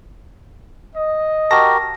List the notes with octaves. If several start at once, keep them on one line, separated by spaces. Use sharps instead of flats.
D#5
F#4 G4 A#4 A5 A#6